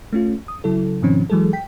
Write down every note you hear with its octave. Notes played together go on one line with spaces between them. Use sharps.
A3 C#4 F4
D#6
C#3 F#3 E4 A4
G#2 B2 D#3 F3 C4 C#4
E3 F#3 G#3 G#4 A4
G5 B6